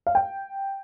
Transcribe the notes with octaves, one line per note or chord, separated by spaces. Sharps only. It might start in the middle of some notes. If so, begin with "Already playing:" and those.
F5
G5